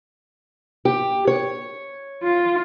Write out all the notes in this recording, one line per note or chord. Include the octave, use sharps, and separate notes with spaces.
G4
C#5
F4